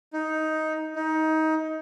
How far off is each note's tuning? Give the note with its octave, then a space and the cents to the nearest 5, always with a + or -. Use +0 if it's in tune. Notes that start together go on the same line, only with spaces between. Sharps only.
D#4 +10
D#4 +20